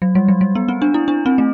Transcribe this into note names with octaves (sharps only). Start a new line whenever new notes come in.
F#3
G3
F#3
G3
B3
C4
D4
E4
D4
C4
A3